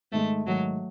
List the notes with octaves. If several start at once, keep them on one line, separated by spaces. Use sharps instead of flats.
G#2 D#3 G#3 A3
G#2 D#3 F#3 G#3